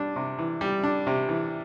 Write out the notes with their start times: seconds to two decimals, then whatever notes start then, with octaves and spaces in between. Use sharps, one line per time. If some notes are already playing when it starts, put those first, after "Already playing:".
Already playing: G3 D4
0.16 C3
0.39 E3
0.61 G3
0.83 D4
1.07 C3
1.29 E3